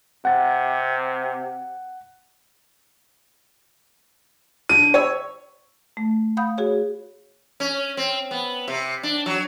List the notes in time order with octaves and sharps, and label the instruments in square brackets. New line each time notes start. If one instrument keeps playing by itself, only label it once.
[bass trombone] C3 [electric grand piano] F#5 A6
[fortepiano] D3 [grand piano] D#7
[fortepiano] C#5 E6
[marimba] A3
F5 F#5 B5 D#6 G6
F#4 G#4 C#5
[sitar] C#4
C4
B3
C3
D4
F#3